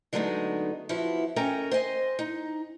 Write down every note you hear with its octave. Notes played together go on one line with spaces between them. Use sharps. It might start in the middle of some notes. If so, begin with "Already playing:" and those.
D3 F#3 G#3 A3 B3 D#4
F3 B3 E4 F#4
C#4 A4 A#4 D#5 G5 A#5
C5 D#5 G#5
D#4